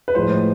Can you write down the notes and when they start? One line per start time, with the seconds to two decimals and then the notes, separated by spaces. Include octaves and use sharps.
0.08 B4
0.15 A2 F3 G#3 C5